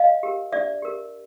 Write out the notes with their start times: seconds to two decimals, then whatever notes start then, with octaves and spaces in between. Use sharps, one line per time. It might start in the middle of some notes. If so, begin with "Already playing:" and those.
Already playing: D#5 F5
0.23 G4 A#4
0.52 D4 D5 E5
0.82 G4 A#4